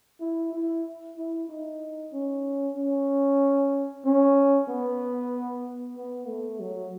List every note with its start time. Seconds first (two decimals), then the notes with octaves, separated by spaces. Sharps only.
0.20 E4
0.53 E4
1.17 E4
1.49 D#4
2.13 C#4
2.76 C#4
4.05 C#4
4.69 B3
5.96 B3
6.28 A3
6.60 F#3